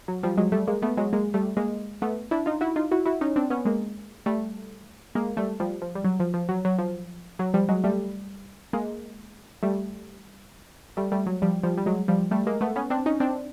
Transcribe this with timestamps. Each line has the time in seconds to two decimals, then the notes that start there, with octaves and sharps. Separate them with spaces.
0.08 F#3
0.23 F3 G3
0.38 F#3 G#3
0.52 G3 A3
0.67 G#3 A#3
0.82 A3 B3
0.97 F#3 G#3
1.13 G#3 A#3
1.34 G3 A3
1.57 G#3 A#3
2.02 A3 B3
2.31 D4 E4
2.46 D#4 F4
2.61 E4 F#4
2.76 D#4 F4
2.91 E4 F#4
3.06 E4 F#4
3.21 C#4 D#4
3.36 C4 D4
3.50 B3 C#4
3.65 G#3 A#3
4.26 G3 A3
5.15 G#3 A#3
5.37 G3 A3
5.60 F3 G3
5.82 F3
5.95 G3
6.04 F#3
6.20 F3
6.34 F3
6.49 F#3
6.65 F#3
6.79 F3
7.39 F#3
7.54 F3 G3
7.69 F#3 G#3
7.84 G3 A3
8.73 G#3 A#3
9.63 G3 A3
10.97 G3 A3
11.12 G3 A3
11.26 F#3
11.42 F3 G3
11.63 F3 G3
11.77 G3
11.86 F#3 G#3
12.08 F3 G3
12.31 G3 A3
12.47 G#3 A#3
12.61 A3 B3
12.76 B3 C#4
12.90 C4 D4
13.06 C#4 D#4
13.20 C4 D4